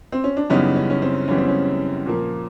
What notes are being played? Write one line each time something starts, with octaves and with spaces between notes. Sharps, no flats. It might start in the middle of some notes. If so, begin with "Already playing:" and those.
C4
C#4
D4
F#2 C#3 E3 G3 B3 C#4 D#4
C#4
C#4
C4
F#2 C#3 E3 G3 B3 C#4
C4
C#4
A#2 F3 A#3